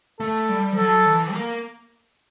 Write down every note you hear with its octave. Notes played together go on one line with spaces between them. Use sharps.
A3 A4
G3
F3
F#3 A4
E3
A#3